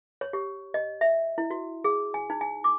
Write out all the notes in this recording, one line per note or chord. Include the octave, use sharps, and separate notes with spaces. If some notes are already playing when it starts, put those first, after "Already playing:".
C#5
G4
D#5
E5
E4
F#4
G#4
G#5
D#4
G#5
D6